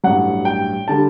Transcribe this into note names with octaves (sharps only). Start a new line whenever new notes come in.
A1 G2 F#3 F#5
G5
D3 G3 A5